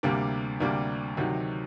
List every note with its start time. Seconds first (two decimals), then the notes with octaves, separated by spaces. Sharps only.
0.03 D2 C3 G3 A#3 D4
0.60 D2 C3 G3 A#3 D4
1.17 D2 C3 D#3 F#3